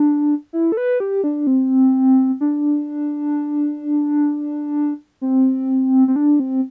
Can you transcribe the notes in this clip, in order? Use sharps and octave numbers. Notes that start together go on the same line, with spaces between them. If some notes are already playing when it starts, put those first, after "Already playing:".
Already playing: D4
E4
A4
B4
G4
D4
C4
D4
C4
C4
D4
C4